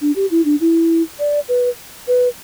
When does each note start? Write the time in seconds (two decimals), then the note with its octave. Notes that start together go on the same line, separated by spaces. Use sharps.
0.01 D4
0.16 G4
0.31 E4
0.45 D4
0.61 E4
1.19 D5
1.49 B4
2.08 B4